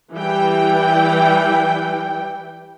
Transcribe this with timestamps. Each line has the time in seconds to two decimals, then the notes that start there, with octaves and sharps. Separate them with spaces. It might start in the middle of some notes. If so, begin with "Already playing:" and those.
0.15 E3 G3 G5